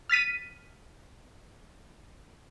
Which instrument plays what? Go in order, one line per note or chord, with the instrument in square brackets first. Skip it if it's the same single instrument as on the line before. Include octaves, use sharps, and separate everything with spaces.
[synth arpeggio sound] F6 A6 B6 D#7